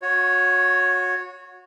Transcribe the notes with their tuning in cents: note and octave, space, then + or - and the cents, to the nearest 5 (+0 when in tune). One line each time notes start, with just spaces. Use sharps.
F#4 -30 C#5 +0